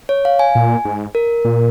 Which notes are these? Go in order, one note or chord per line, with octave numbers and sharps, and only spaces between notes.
C#5
F5
G#5
A#2
G#2
A#4
A#2